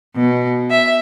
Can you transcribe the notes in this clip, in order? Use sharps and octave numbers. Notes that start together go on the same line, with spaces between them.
B2
E5